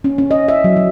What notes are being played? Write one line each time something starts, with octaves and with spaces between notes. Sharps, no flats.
C#4
C#4
D#5
E5
F#3
F#3